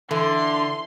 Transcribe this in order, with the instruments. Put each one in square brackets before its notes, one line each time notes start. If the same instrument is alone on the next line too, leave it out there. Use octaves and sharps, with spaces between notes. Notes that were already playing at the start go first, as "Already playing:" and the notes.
[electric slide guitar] D3 [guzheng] E3 [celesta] A4 [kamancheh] C6